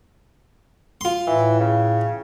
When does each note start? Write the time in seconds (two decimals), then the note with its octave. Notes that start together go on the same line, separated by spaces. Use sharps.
1.01 F4 C6
1.27 A2 E3
1.60 C#3